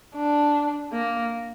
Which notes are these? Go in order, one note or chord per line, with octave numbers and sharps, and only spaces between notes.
D4
A#3